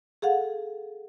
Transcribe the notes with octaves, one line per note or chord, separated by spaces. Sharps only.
G#4 A4 F5 F#5